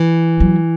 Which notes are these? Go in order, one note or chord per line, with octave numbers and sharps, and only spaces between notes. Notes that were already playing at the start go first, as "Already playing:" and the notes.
Already playing: E3
F#3